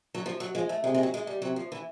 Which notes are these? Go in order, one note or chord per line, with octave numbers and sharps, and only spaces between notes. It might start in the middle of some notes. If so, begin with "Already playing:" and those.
F#3
F3
F#3
F3 G#3
A3
C3 G#3
G#3
F#3
G#3
G3
C3 F#3
F3
E3